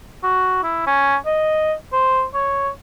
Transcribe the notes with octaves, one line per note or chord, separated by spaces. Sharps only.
F#4
E4
C#4
D#5
C5
C#5